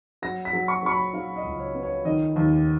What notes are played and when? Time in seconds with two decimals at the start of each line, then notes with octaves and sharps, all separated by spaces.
0.22 F#3 A#6
0.45 B6
0.53 F#3
0.68 C#6
0.83 F#3 C#6
0.91 B5
1.14 F#3 F5
1.36 D#5
1.44 C#2
1.60 C#5
1.74 B3
1.83 C#5
2.05 D#3 D#5
2.36 D#2